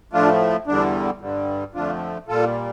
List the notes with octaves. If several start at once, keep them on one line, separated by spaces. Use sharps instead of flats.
A2 F3 A3 D4 F4
E2 D3 G3 D4
G2 D3 G3
F2 D3 F3 A3 D4 F4
A#2 G3 F4 A4